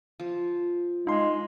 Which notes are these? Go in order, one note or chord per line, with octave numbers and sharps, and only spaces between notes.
F3
G#3 D#4 F5 C6